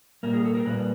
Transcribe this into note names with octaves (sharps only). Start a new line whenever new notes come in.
A#2 G3 A#3 A#4
G#4
A4
A#4
A#2 G3 A#3 B4